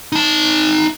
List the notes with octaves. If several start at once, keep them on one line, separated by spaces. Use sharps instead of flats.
D#4 A5